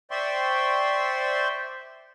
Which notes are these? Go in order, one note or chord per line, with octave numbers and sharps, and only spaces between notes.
C5 D5 E5 G5 C6 C#6